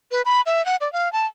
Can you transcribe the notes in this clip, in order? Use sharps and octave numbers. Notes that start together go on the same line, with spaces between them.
B4
B5
E5
F#5
D5
F5
A5